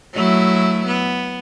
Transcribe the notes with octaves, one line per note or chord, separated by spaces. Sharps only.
F#3 A3 E4
B3